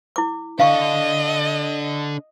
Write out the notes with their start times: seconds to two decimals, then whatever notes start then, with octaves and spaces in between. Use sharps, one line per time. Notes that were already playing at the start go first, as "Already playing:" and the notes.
0.16 E4 D6
0.60 D4 A4 D#5 F5 C#6